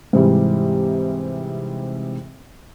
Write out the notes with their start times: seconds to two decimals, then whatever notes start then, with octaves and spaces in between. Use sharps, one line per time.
0.13 G#2 C3 E3 G3